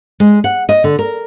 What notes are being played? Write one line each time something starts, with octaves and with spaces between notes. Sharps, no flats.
G#3
F#5
D#5
D3
A#4